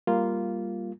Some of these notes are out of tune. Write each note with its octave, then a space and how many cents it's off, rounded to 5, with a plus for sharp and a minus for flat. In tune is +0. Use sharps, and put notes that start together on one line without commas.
G3 +5 A#3 +0 F4 -5